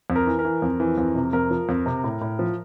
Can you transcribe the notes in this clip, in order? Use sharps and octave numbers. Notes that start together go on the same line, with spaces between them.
F2
A#4
E3
A#4
E3
F2
E3
F2
C3
F2 A#4
F3
F2
C3
A2
A2
F3